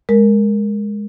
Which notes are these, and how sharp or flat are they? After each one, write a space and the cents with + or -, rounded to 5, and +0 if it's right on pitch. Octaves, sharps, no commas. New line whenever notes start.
G#3 +0 A#4 -5